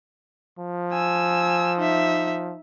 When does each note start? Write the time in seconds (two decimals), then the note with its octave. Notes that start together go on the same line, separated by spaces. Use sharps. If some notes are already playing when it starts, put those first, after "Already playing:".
0.59 F3
0.92 G#5 E6
1.78 D#4 E5